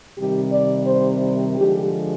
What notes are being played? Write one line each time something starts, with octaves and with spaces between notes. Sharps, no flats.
C3 D#3 G3 G4
D5
C5
D3 F3 G#3 G4